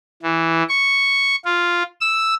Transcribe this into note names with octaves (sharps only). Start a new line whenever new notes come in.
E3
C#6
F4
E6